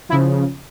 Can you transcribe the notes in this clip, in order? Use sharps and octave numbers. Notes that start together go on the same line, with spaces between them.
C#3 F3 E4